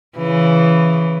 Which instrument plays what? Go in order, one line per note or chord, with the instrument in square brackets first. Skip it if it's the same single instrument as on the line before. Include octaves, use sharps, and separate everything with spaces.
[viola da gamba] C#3 E3